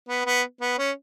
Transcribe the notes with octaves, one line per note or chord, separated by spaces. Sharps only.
B3
B3
B3
C#4